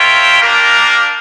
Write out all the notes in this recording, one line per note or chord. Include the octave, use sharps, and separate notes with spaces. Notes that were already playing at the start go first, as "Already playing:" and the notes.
Already playing: F4 A#4 C#5 E5 G5
A#3 D4 G4 A#4